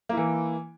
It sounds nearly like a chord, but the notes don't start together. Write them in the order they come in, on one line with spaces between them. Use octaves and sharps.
A#3 E4 E3